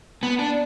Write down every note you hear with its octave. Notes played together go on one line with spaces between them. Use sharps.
B3
D4